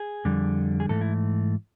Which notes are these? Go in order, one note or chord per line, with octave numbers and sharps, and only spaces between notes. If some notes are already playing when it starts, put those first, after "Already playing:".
Already playing: G#4
F2 D3 G3
G#4
G#2 E3 A3 A4
E4